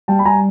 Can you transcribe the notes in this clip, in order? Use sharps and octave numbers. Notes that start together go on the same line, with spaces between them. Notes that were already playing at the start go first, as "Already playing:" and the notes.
G3 G5 A5
B5
G3 G#5 A#5